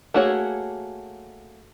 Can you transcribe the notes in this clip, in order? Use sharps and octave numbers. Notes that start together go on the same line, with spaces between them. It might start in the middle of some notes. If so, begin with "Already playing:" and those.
A3 A#3 F#4 G#4 C#5